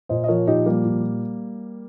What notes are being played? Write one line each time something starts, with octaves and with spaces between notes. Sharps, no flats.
A#2 C5 D#5
D#5
F3 A#4 C#5
A#2 D#4 G4
F3 G3 A#3
A#2